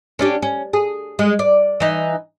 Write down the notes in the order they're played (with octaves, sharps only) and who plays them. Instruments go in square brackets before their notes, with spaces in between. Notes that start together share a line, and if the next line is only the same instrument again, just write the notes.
[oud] C#4 D4 G4
C#4
G#4
G#3
D5
E3 D#4